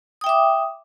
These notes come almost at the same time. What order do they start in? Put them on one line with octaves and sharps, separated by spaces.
D#6 G5 E5 D6